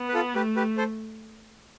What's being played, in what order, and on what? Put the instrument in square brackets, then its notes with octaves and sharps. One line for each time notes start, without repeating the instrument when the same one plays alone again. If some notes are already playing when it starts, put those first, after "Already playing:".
Already playing: [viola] B3
[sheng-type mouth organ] B4
F4 A4
[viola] A3 [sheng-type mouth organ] G4 B4
[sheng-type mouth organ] G4 B4
A4 C5